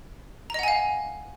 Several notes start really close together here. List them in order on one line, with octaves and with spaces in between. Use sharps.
A#5 D#5 F#5 G#5 F5